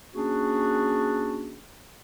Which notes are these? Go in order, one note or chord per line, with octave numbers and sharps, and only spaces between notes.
A#3 C#4 D4 F#4 G#4